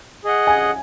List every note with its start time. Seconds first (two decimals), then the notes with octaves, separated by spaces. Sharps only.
0.24 G#4 D#5 F#5
0.47 G#5